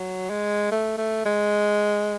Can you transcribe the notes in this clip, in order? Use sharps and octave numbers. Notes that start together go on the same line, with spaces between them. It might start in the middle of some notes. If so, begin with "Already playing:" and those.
Already playing: F#3
G#3
A3
A3
G#3